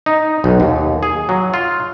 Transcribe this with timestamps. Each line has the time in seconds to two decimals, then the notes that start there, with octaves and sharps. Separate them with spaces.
0.06 D#4
0.44 B1
0.60 D#2
1.03 G#4
1.29 F#3
1.54 F4